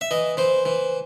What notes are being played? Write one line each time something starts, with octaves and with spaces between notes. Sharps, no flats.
E5
E3 D#5
E3 C5
E3